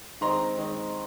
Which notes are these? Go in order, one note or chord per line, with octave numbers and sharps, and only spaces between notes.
D#3 G#3 C4 A#5 C6
D#3 G#3 C4